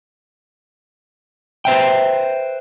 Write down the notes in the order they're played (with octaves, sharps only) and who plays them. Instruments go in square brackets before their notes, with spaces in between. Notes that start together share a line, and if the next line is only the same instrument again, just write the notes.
[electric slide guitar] B4 C5 E5 G5